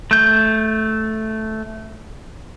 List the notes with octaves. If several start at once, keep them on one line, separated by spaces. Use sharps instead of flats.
A3 G6